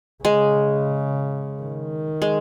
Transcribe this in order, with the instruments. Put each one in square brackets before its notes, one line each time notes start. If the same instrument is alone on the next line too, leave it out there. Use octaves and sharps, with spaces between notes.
[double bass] C#3 [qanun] G#3
[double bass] D#3
[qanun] G#3